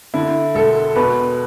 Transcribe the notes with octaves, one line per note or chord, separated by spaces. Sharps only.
D3 E4
E1 A4
B2 B4